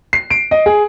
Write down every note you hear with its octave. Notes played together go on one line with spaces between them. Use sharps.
C7
D7
D#5
G#4